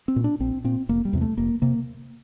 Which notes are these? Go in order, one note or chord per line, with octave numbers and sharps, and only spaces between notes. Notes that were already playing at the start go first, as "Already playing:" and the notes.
C4
A#2
D4
A#1 C4
A#2 C4
F1 A#3
G3
E2 C3
A3
F1 A#3
C3 A#3